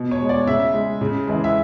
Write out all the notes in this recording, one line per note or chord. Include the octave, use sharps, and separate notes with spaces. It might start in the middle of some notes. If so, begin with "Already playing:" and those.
Already playing: B2
C#5
G#3
D5
C#3 E5
G#3
C#3
E3 G#3
E5